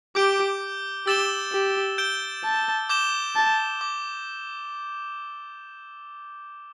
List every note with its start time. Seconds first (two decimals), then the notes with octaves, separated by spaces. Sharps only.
0.15 G4 D6 G6 D7 G7
1.06 G4 E6 A6 E7 G7
1.52 G4
1.98 G6 D7 G7
2.44 A5
2.89 D6 G6 E7 G7
3.36 A5
3.81 D6